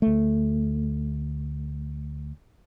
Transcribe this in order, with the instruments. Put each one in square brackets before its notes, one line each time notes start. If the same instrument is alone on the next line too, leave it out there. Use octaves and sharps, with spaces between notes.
[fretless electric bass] D2 A3